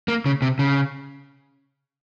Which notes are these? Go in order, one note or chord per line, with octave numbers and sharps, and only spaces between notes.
A#3
C#3
C3
C#3